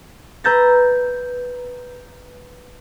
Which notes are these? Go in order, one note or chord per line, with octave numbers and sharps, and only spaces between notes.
B4 A#5 E6 G6 A6 A#6